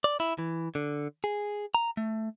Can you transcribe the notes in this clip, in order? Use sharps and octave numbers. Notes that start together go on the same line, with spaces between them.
D5
E4
E3
D3
G#4
A#5
A3